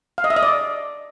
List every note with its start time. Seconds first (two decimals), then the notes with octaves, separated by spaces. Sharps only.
0.18 F5
0.24 D#5
0.30 E5
0.37 D#5
0.43 D5